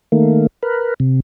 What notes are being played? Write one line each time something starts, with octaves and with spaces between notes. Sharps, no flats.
D#3 A3 A#3
A#4 B4
C3